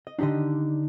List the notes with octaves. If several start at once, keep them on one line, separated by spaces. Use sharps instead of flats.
D#5
D3 D4 D#4 G4 D#5